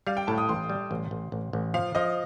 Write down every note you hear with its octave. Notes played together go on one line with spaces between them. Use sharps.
G3 F5
G5
A2 A5
D#6
A1 C6
G3
A1
A1
A1
A1
F3 F5
F3 D#5